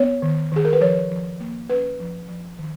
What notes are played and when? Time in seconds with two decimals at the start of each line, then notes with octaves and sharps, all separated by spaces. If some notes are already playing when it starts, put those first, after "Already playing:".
Already playing: B3 C#5
0.22 D#3
0.52 D#3 G#4
0.65 A#4
0.73 B4
0.81 F3 C#5
1.11 F3
1.40 A#3
1.69 C#4 B4
2.00 F3
2.28 F3
2.59 D#3